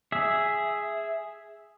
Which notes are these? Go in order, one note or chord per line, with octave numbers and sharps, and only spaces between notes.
G#4 E5